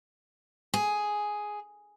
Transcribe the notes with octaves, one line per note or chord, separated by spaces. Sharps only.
G#4